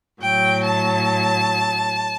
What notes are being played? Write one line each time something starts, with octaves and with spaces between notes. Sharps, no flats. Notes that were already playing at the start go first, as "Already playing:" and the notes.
A2 F#3 G5
A5